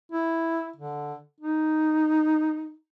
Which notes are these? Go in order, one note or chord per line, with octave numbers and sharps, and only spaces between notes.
E4
D3
D#4